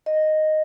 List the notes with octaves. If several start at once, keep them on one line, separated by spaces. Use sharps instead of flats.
D#5